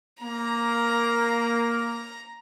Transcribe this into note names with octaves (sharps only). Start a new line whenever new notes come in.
A#3 A#5